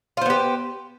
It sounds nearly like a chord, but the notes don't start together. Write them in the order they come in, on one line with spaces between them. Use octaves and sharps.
F4 C5 B3 G4